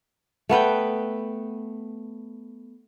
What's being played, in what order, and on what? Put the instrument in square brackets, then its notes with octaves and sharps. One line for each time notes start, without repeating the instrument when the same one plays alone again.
[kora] A3 B3 B4 G5